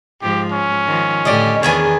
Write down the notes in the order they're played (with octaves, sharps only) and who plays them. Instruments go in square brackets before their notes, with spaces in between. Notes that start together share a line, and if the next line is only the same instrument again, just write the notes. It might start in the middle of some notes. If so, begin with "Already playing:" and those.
[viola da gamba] G#2 F3 [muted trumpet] G4
[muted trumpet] C#4
[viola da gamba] D#3 F3
[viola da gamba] A2 D3 G4 [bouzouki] D5 D#5
[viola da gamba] E2 D4 B4 [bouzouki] D#3 G#4 G#5